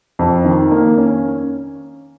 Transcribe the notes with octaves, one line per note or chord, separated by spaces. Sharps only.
F2
D#3
A#3
C#4